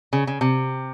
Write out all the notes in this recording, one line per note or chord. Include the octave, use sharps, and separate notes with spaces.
C#3
C#3
C3